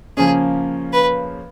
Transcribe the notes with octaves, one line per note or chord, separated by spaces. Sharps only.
C#3 F3 A#3 C#4 G#4
B4